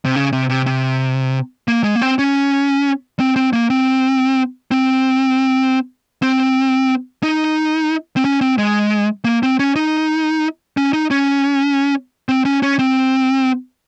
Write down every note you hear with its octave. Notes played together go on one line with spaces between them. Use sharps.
C3
C#3
C3
C3
C3
A#3
G#3
A#3
C4
C#4
C4
C4
A#3
C4
C4
C4
D#4
C4
C#4
C4
G#3
A#3
C4
C#4
D#4
C#4
D#4
C#4
C4
C#4
C#4
C4